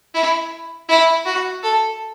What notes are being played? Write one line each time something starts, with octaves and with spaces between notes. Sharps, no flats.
E4
E4
F#4
A4